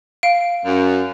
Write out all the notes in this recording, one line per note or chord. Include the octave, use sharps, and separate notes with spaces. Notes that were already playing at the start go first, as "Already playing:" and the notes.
F5 D7
F#2